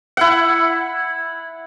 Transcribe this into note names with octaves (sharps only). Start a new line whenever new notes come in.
E4 F#5